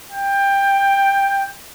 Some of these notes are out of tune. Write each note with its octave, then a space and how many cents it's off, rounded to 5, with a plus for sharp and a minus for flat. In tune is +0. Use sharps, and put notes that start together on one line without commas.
G5 +15